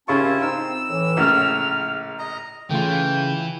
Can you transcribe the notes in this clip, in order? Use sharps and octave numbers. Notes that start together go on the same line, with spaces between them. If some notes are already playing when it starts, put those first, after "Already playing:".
D#2 C#3 C4 E4 F4 A5 C#6
C4 D#4 E6
A2 E3
A#1 A2 C#3 F6
D#5 A#5
C#3 E3 A3 F4 G5